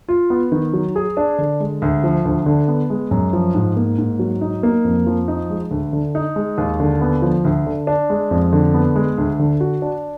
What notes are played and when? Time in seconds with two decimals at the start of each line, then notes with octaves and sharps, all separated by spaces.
0.09 F4
0.30 B3
0.52 D#3
0.73 F#3
0.96 G#4
1.17 D4
1.39 D3
1.60 G#3
1.82 D2
2.04 F3
2.25 D2
2.46 D3
2.68 B3
2.90 G#3
3.11 F#2
3.33 F3
3.55 G#2
3.77 A#3
3.98 G#2
4.19 F#3
4.41 D#4
4.63 A#3
4.85 F2
5.06 F3
5.28 D#4
5.50 G#3
5.71 D2
5.93 D3
6.15 D#4
6.36 G#3
6.58 D#2
6.80 D3
7.01 B3
7.22 F3
7.45 D2
7.66 D3
7.87 D4
8.10 G#3
8.31 F2
8.53 D3
8.74 B3
8.96 G#3
9.18 D2
9.39 D3
9.60 F#4
9.82 D4